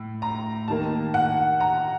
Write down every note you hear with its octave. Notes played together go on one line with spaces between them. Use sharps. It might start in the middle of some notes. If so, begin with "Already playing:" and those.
Already playing: A2
A#5
D#2 D#3 A#3 A5
F#5
A#5